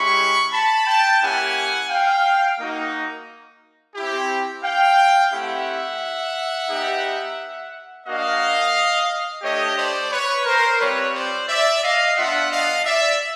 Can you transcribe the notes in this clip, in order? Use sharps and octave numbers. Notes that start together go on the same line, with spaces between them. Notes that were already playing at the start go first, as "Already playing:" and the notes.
Already playing: G#3 C#4 E4 G4 B5 C#6
A5 B5
G5 A5
A#3 C#4 E4 G4 F#5 G#5
F5 G5
A#3 D#4 F#4
C4 E4 G4
F5 G5
A3 C4 E4 G4 E5 F#5
B3 D#4 G4
A#3 D4 F#4 D#5 F5
A3 D4 G4 C#5 D#5
C5 D5
B4 C#5
A#4 C5
G3 C4 F4 B4 C#5
C5 D5
D5 E5
D#5 F5
B3 D4 F4 E5 F#5
D#5 F5
D5 E5